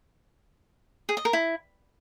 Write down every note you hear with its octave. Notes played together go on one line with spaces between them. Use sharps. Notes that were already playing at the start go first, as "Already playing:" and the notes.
G#4
D#5
A#4
E4